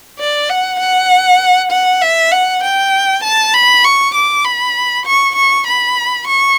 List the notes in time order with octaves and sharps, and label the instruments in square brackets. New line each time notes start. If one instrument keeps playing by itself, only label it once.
[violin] D5
F#5
F#5
F#5
E5
F#5
G5
A5
B5
C#6
D6
B5
C#6
C#6
B5
C#6